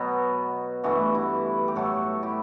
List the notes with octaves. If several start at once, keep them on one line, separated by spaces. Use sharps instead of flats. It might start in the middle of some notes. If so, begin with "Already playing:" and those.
Already playing: B2 F#3 B3 F#4
G2 E3 A3 F#4
E4
G4
A2 F#3 A3 F#4 A4
E4 G4